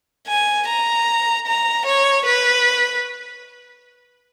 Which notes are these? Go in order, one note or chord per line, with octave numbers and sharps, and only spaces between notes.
G#5
A#5
A#5
C#5
B4